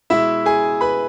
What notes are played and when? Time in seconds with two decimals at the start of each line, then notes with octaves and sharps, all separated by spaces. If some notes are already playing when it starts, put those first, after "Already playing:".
0.10 B2 G#3 E4 E5
0.46 G#4 G#5
0.81 B4 B5